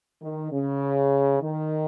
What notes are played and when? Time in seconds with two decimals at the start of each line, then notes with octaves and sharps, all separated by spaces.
0.21 D#3
0.51 C#3
1.40 D#3